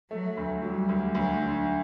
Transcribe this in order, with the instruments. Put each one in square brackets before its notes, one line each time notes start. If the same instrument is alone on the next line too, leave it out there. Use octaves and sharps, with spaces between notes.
[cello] F#3 [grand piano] A3
[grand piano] D2
[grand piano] F#3 [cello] G3
[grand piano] D2
[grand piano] D2 [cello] F#3
[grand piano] D3